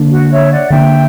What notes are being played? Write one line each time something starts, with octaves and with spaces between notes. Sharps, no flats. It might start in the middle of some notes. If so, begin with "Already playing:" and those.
Already playing: D3 A#3 D4
F#4
C#5 E5
D5 F#5
D3 A#3 D4 E5 G5